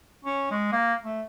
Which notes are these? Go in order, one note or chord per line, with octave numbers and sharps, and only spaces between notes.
C#4
G#3
A#3
A3